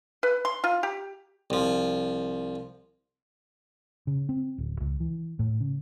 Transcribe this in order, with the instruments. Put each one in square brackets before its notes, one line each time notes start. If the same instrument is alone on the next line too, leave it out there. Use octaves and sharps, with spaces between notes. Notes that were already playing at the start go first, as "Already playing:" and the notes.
[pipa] B4
C6
F4
G4
[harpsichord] C2 F3
[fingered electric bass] C#3
C4
D1
C#2
E3
A2
C#3